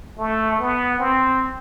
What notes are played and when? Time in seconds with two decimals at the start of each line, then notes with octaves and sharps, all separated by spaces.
0.19 A3
0.59 B3
0.98 C4